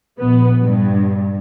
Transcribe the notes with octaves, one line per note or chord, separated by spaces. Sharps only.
A#1 B3
G2